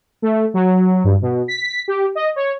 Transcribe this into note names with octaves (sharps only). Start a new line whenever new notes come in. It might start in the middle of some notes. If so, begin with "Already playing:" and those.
A3
F#3
G2
B2
B6
G4
D#5
C#5